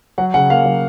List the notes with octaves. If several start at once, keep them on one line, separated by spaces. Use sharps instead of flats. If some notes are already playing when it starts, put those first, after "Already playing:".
F#3 F#5
C#3 F#5
A#3 F5
F#3